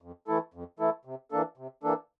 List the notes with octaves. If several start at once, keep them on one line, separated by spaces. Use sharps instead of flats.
F2
E3 A3 E4 A4
F2
E3 A3 E4 A4
C3
E3 A#3 D4 A4
C3
E3 A#3 D4 A4